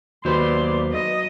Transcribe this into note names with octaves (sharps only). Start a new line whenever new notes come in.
D#2 F#3 B4 C5 D5 C6
D#5